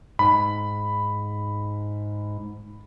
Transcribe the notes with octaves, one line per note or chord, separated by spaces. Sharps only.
G#2 B5